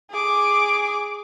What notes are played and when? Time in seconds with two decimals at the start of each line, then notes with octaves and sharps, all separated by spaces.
0.11 G#4 D6